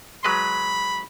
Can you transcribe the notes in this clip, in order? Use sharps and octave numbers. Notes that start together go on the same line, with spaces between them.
F#3 G#3 B4 B5